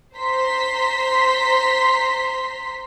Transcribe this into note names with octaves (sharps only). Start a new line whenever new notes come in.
C5 A#5 C6 B6